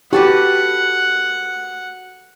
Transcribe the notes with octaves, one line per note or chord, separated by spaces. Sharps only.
F#4 G4 A4 B4 F#5